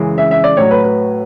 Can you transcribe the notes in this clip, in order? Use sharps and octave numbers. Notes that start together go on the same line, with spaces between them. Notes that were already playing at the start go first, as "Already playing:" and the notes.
Already playing: F#2 C#3 E3 G#3
E5
E5
D5
A2 F#3 C#5
B4
B4